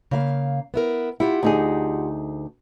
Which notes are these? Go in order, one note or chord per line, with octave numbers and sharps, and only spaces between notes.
C#3 A#3 F5
B3 E4 A#4
E4 F4 G4 F#5
D2 D#4 G#4